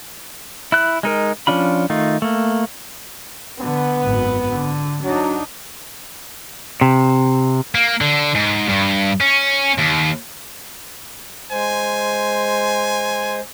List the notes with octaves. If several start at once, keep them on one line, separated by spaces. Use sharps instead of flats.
E4 F#6
G#3 D#4 A#4
F3 C#4 D4 F4 B5
D#3 A3 D#4 F4
A3 A#3
D3 B3
G#1 F#2
D3
F#3 D4 D#4
C3
A#3
D3
G#2
G2
C#4
D#2
G#3 C5 G#5